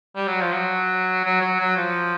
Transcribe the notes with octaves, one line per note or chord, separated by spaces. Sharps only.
G3
F#3
F3
F#3
F#3
F#3
F#3
F3